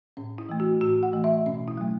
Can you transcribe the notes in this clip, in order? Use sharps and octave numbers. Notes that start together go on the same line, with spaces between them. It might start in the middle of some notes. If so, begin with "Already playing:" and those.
A2 C#4
E4
E3 A3
F#4
A2 F#4
F#5
E3 A3
E5
B2 C#4
E4
F#3 A3